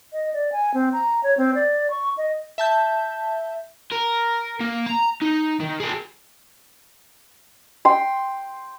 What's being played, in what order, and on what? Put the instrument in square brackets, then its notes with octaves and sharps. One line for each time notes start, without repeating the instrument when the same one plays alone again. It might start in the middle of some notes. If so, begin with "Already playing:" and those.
[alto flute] D#5
D5
G#5
C4
A#5
C#5
C4
D5
C#6
D#5
[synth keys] E5 A5 G6
[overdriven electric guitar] A#4
A#3
A#5
D#4
D#3
G#4 A#4
[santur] G5 C6